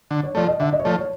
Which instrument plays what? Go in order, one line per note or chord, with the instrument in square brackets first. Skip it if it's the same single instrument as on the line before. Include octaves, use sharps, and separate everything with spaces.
[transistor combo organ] D3
[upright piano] C#5
[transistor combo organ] F3 A3 [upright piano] D5
[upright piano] D#5
[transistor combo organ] D3 [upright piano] E5
[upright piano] D#5
C#5
[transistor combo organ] F3 A3 [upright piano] D5
[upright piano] C#5